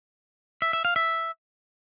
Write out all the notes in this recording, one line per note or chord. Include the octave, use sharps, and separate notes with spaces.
E5
E5
F5
E5